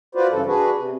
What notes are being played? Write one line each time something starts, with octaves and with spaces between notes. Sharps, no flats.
F4 F#4 B4 C5 D5
G2 C#3 E3 A4
D4 F#4 G#4 B4
C3